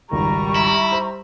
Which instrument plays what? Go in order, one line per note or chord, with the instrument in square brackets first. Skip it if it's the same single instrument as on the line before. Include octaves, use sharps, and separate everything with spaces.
[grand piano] G#1 C#2 D#3 [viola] G3 [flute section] A#5 C#6
[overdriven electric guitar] E4
[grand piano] C5